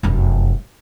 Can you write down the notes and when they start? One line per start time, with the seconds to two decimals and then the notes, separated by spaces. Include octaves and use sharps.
0.03 F1 F#2